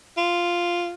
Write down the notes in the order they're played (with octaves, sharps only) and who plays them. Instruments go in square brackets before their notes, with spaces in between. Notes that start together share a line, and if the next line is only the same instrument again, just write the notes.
[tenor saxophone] F4